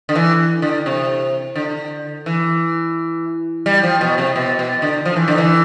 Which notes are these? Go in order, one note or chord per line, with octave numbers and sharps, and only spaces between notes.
D3
E3
D3
C3
D3
E3
G3
F3
B2
C3
B2
B2
D3
F3
E3
D3
E3